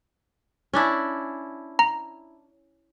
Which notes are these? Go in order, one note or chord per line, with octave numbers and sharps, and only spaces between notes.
C#4 D4 E4
A#5